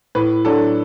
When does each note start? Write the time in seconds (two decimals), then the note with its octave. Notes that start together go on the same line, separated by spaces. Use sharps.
0.15 A2 B4
0.45 F#3 D4 A4